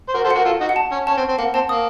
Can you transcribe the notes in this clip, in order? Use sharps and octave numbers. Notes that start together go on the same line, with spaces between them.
C5
F#4 A#4
A4 C5
F#4 A#4 F#5
F4 A4
D#4 F#4
F#5
A5
C#4
C#4 A5
C4
C4
A#3 F#5
C4 A5
A#3 D#6